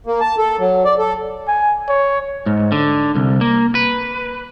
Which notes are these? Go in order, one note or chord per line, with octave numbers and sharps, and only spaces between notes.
A#3
A5
A4
F#3
D5
A4
G#5
C#5
G#2
D3
C2
A#3
B4